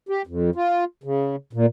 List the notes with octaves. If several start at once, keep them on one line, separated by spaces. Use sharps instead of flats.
G4
F2
F4
C#3
A#2